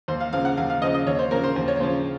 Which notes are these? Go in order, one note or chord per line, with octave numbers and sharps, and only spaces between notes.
D#2 C5
F5
C#3 F3 F5
F#5
D#2 F5
F5
C#3 F3 D#5
D#5
D#2 C#5
C5
C#3 F3 A#4
C5
D#2 C5
C#5
C#3 F3 C5